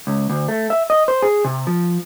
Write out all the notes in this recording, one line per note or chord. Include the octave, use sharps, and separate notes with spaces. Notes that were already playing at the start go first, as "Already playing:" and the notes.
C#2
D2
A3
E5
D#5
C5
G#4
C3
F3